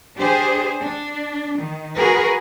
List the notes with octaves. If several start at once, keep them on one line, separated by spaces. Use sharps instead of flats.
D4 G4 G#4 C5
D4
D#3
F#4 G#4 A#4 B4